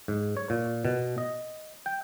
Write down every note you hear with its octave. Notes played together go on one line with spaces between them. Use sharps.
G#2
C#5
A#2
B2
D#5
G5